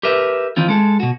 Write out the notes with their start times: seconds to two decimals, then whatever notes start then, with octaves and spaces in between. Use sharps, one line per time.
0.03 G4 A#4 B4 E5
0.57 D#3 E3 C4 F4
0.69 G#3 A4
1.00 B2 F#4